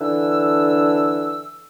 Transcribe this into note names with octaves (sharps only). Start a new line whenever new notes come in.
D3 E3 D4 E6